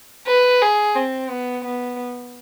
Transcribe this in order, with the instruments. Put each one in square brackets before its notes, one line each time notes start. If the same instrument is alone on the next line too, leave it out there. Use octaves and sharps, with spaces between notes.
[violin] B4
G#4
C4
B3
B3